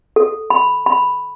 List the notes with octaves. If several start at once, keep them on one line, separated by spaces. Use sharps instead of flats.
A4
B5
B5